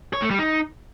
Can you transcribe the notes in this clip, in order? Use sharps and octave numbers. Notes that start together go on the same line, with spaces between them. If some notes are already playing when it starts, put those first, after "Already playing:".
C#5
A3
G3
D#4